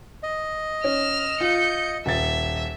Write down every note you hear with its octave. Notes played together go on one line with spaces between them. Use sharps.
D#5
C#4 F6 E7
F4 G6 C#7
D#1 E5 A6